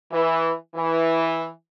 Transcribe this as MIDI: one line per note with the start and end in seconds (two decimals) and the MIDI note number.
0.12 0.51 52
0.75 1.47 52